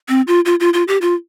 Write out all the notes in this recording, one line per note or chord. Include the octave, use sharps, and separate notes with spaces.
C4
F4
F4
F4
F4
G4
F4